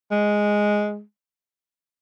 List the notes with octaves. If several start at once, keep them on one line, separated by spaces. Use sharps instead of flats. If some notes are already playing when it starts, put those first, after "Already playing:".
G#3